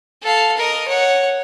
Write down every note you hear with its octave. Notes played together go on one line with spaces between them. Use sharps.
A4 F5
A#4 D#5
C#5 F#5